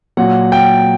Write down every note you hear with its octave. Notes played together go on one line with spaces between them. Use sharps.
A#2 F#3 F#5
G5